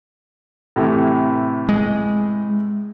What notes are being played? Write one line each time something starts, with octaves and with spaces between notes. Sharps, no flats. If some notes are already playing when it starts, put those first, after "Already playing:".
A2 C3 E3
G#3